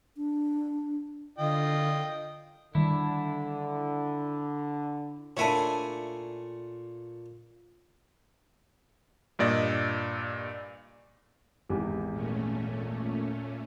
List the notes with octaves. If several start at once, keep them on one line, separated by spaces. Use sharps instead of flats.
D4
D3 F4 D#5 G5
D3 D#3 G3 D4 E4
A#2 A3 D4 E4 C#5 G#5
G2 A#2 D5 D#5
G#1 E2 G4
A#2 A3 C#4